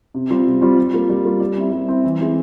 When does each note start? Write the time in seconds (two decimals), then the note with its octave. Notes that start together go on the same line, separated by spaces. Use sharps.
0.14 C3
0.30 G3 C4 F4
0.46 C3
0.61 G3 C4 F4
0.78 G3
0.93 A#3 F4
1.09 G3
1.25 A#3 F4
1.40 G3
1.57 C4 E4
1.72 G3
1.88 C4 E4
2.04 E3
2.20 G#3 C4 E4